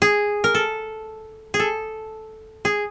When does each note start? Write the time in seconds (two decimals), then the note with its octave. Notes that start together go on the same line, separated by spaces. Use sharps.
0.02 G#4
0.44 A#4
0.55 A4
1.54 G#4
1.60 A4
2.65 G#4